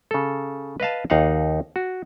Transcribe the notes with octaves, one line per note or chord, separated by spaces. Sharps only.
C#3 A4
B4 D#5 F5 A5
D#2 D#4 F5 F#5
F#4